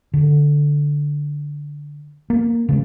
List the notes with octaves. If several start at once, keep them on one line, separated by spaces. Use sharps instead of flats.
D3
A#3
C#3 G3 G#3